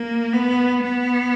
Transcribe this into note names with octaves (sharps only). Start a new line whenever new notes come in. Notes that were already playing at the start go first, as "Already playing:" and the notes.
Already playing: A#3
B3
B3